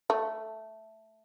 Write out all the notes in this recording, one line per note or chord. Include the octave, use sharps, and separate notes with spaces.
A3